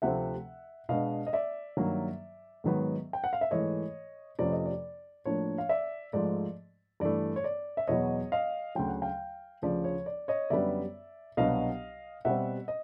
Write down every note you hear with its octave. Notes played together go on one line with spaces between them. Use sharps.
D2 C3 F3 A3 C4 E5 F#5
B2 G#3 B3 D4 D#5 F5
D#5
D5 E5
G2 D#3 F#3 A#3
G#2 D#3 F#3 B3
G5
F#5
F5
E5
G#2 E3 A3 C#5 D#5
F2 C3 F3 A3 C#4 D5
D#5
D5
A2 F3 A#3 D4 C#5
F5
D5 E5
G#2 F3 A3 D5
G2 E3 A3 D5
C#5
D5
E5
E2 B2 F#3 B3 C#5 D#5
D#5 F5
D2 C#3 F#3 G5
F#5
F5 G5
D2 C#3 F3 D5
C#5
D5
C#5 D#5
F#2 D3 G3 B3 D5 E5
C2 B2 F#3 B3 D4 D#5 F5
B2 G3 C4 E5 F#5
D#5